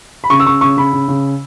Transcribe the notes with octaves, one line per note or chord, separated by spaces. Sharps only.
B5
C#3 C#6
E6
C#3 C#6
C#3 C#6
C#3 B5
C#3
C#3